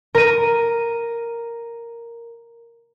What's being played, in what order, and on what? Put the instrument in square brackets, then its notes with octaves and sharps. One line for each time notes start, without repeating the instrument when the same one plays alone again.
[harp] A#4 D#7